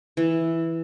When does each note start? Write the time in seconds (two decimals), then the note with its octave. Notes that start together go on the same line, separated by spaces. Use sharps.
0.17 E3